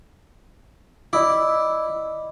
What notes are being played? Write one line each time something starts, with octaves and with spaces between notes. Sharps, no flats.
E4 D5 D#5 D6